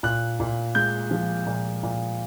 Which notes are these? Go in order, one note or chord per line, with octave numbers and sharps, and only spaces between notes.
A#2 F#6
A#2
G#3 G6
F3
A#2
A#2